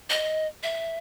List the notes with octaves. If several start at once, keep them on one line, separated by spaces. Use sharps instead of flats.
D#5
E5